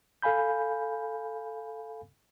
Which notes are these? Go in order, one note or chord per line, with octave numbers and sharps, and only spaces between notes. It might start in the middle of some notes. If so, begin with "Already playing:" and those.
A4 F5 G#5 B5 G6